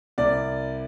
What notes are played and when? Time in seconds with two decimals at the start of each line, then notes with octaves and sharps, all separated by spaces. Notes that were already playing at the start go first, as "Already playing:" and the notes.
0.18 C2 D5